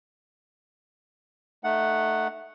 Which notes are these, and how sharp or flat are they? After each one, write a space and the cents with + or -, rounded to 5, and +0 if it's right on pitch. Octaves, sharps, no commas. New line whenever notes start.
A3 +0 D#4 -20 F#5 +0